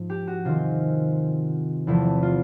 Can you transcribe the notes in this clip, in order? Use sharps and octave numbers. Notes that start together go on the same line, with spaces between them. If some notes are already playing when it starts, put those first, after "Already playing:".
Already playing: G#2 F3
G4
F#4
C3 D#3 G#3 C4 F4
E2 C3 F3 A3 E4
F4